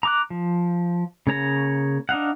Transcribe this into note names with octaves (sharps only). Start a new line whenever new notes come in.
A#5 D6 F#6
F3
C#3 A#3 C#5 A#5
D4 D#4 F5 F#5